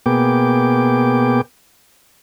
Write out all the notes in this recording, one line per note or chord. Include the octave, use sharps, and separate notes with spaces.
B2 A#3 B3 G#4 G5 D6